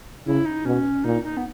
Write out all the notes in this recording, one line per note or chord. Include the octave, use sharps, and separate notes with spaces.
C#3 E4
D#4
B2 C#4
A#2 D#4
D#4
B3